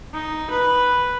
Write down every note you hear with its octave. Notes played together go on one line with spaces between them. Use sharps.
D#4
B4